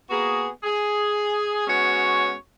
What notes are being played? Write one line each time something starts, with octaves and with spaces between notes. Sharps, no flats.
A#3 B3 F#4 G#4
G#4
G#3 B3 C#4 F#4 C#5